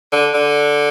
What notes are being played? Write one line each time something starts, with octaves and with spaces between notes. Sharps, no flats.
D3
D3